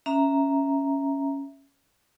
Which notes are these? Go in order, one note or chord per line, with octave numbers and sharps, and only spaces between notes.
C#4 E5 A#5